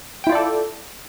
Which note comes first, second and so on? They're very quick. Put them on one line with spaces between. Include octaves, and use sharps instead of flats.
G5 E4 F4 D5 A4